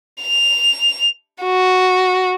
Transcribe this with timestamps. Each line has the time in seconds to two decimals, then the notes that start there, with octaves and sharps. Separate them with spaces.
0.21 F7
1.43 F#4